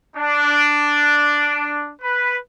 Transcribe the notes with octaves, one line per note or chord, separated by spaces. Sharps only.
D4
B4